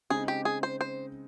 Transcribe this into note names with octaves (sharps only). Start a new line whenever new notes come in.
C#3 G#3 C4 D#4 G#4
G4
G#4
C5
C5